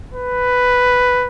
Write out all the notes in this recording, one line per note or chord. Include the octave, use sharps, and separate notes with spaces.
B4